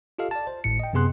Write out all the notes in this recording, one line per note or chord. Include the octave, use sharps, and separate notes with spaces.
F4 G4 A4 D#5 F5
D5 A5
C5
G#1 A2 A3 C#7
D#5 G5
F#2 C3 B3 G#4 C6 F#6